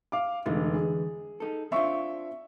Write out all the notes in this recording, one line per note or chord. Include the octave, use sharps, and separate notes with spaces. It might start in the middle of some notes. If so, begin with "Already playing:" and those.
F5 D6
F1 D3 E3 G#3
G#4
D#4 A4
C4 D4 F4 E5 C#6